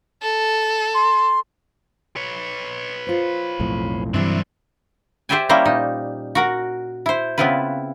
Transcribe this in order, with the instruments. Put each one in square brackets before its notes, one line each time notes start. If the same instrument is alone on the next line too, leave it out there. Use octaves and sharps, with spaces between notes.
[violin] A4
[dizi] C6
[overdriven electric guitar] B4 C#5
[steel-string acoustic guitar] F4 C5
[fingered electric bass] B1 F2 A2
[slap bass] G2 E3 F#3 [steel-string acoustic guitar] C3 E4 [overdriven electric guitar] C4 D4
[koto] G4 C5 D5 E5 G5 G#5
G3 A#3 C#4 E4 C5 A#5
A#2 D#4
F#4 A#4 F#5
E4 C5
C#3 B3 C4 E4 F4 B4